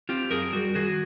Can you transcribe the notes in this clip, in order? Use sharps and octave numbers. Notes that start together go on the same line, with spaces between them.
C4 F4 G4
F#2 G#4 A#4
G3 F#4
D#3 F#4 G#4